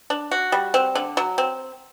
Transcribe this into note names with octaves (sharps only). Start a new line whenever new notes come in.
D4
F#4
G3
C4
D3
F#3
C4